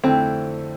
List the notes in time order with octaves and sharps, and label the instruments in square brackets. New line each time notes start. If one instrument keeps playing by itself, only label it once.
[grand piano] F2 D3 A3 E4 [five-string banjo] C4